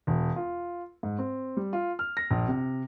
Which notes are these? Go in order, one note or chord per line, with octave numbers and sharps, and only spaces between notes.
E1
F4
G#2
C4
G3
F4
F6
A#6
A#1
C3